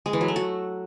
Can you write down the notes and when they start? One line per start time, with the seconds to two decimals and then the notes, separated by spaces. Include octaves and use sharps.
0.06 G#3
0.13 E3
0.21 F#3
0.28 A3
0.36 F#4